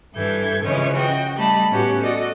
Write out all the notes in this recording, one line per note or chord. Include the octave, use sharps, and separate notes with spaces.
G2 E3 A4 G6 G#6
C#3 E3 F3 G#3 C#4 C#5
F#4 D#5 G5
G3 A3 D#5 A5 B5
A2 B3 C#4 F#4 G4
F#4 A4 D5 D#5